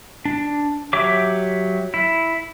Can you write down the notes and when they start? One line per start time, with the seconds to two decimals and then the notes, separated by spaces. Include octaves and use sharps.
0.25 D4
0.93 F#3 G4 C#5 E5 D6
1.94 E4